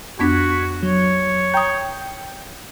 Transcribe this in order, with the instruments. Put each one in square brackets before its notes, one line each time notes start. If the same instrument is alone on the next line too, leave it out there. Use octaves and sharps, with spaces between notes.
[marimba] F2 B3 D4 [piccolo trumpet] F#4 [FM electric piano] C#6 G#6 B6
[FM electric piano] F#3 [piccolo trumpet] C#5
[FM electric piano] G5 G6 [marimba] A#5 D#6